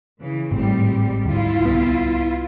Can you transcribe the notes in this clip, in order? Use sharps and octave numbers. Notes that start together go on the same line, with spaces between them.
C#3 E3
G#1 A2 G3 G#3 C4
D2 G#2 E4 F4
C2 B3